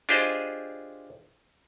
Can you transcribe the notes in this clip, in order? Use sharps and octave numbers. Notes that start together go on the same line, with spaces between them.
D4 F4 G4 G#4 C5 D#5